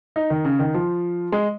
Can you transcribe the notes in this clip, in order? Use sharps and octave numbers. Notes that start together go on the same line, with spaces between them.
D#4
D#3
C#3
D#3
F3
G#3